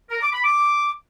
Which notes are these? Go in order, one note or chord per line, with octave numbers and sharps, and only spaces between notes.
A#4
D6
B5
D6